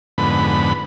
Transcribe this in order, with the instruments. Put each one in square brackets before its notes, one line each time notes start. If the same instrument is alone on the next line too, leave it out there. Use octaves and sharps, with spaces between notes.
[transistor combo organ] F2 G#2 D3 B3 B5